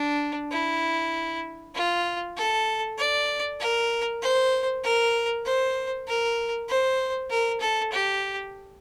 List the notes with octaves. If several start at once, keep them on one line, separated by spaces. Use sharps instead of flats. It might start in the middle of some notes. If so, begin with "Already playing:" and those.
Already playing: D4
E4
F4
A4
D5
A#4
C5
A#4
C5
A#4
C5
A#4
A4
G4